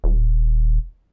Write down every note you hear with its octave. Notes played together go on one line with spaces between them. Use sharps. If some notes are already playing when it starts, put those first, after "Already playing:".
D#1